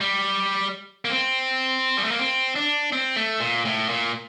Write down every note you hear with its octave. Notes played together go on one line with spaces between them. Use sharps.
G3
A#3
C4
G3
A3
A#3
C4
D4
C4
A3
A#2
A2
A#2